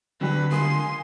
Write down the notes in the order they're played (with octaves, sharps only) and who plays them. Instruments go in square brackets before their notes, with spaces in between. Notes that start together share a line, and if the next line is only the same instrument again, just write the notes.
[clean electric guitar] D3 [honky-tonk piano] F#3 G3 G4 [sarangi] B4
[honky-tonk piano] C#2 A#3 D#6 [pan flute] G#5 [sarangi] C6